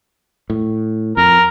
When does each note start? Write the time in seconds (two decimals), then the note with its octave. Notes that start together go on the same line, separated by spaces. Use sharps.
0.50 A2
1.17 F2 A#4